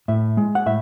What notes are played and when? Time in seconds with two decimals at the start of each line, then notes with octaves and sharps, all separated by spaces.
0.08 A2 E5
0.37 G#3
0.55 F#5
0.66 A2 E5